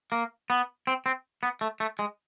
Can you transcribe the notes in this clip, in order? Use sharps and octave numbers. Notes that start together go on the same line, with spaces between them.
A#3
B3
C4
C4
B3
A3
A3
G#3